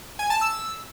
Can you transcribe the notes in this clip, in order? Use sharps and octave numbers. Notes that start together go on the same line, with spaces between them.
G#5
A5
E6